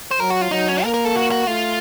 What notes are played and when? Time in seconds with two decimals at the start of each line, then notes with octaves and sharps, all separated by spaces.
0.11 C5
0.20 F#3 A#4
0.30 F#4
0.41 F4
0.51 F#3 D#4
0.68 C#4
0.84 A#3 A#4
0.94 A#4
1.05 A4
1.16 F#4
1.31 F#4
1.47 A3 F4